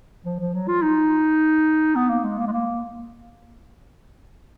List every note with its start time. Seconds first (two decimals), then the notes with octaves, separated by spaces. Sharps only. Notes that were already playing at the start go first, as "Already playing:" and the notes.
0.25 F3
0.39 F3
0.54 F#3
0.68 F4
0.82 D#4
1.95 B3
2.10 A#3
2.23 G#3
2.38 A#3
2.47 G#3
2.52 A#3